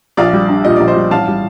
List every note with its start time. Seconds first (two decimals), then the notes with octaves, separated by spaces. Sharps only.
0.17 A#1 D5 F5
0.33 G3
0.49 D4
0.65 A#2 D#5
0.76 A#1 D5
0.88 C5 D#5
0.96 G3
1.11 A1 F5 A5
1.27 G3